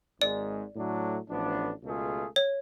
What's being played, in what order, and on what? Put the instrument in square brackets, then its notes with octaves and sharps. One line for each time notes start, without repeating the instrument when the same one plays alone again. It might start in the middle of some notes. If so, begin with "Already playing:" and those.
[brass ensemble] G#1 G#2 G#3 [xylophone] D5
[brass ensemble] A2 F#3 A3 D4
A1 A2 F3 B3 D4
C#2 B2 A3 F4 G#4
[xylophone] C#5